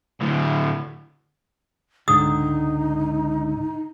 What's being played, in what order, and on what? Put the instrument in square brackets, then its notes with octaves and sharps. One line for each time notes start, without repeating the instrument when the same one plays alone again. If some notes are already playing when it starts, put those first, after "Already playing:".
[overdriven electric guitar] D2 A2
[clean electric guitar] C#2 G#2 D3 [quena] D#4 [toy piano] D#6